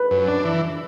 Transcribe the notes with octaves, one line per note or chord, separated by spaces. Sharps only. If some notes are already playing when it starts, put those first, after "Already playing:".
Already playing: B4
F#2
D4
E3